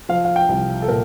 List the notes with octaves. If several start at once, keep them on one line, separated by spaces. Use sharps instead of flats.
F3 F5
F5
G5
C2
A4
A#2 A#4